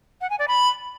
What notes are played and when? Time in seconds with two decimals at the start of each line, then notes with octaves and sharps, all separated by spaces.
0.21 F#5
0.30 G#5
0.39 D5
0.48 B5